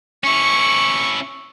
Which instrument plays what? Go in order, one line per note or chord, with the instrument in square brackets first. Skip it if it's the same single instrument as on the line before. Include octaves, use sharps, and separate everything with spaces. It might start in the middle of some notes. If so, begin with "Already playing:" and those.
[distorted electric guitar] C#4 E4 [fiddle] C#6